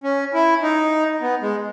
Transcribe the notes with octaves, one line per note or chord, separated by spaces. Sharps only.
C#4
E4
D#4
B3
G#3